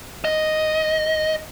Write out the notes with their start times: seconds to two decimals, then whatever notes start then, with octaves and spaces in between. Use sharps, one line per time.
0.25 D#5